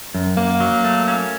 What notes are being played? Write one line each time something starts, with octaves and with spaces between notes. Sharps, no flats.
F#2
F#2 A#3
F#3
A3
C#4